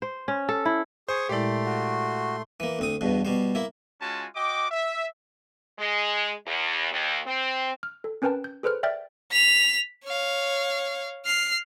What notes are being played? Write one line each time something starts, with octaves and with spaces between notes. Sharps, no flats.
C5
C#4
A4
E4
G#4 C5 C#6 D#6
A#2 G#3 A3 E4 G4 D5 C6
F#4
E3 A#3
D2 C4 D#6
E2 G2 B2
B2 G3 C5
A#3 E4
G#3 C#4 F4 F#4 G#5 A5
F#4 D#5 G5 D6
E5
G#3
E2
D#2
C4
F6
A4
C4 C#4 A#4 B4 G5 A5
G6
G#4 A4 B4 C5 F6
D5 E5 G5 F6 G6 A6
B6 F7
C#5 F5
F6 C7